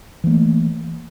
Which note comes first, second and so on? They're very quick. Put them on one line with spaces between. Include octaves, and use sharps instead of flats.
E3 A#3 A3